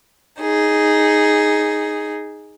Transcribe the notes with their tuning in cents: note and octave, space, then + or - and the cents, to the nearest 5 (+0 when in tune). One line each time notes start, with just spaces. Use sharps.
D#4 +0 G#4 +0